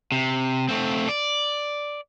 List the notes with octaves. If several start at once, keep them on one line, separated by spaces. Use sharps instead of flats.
C3
A3 C4
D5